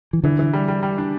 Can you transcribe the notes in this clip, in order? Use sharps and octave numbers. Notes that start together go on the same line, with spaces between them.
E3
D3 E3
E3
G3
G3
G3
D4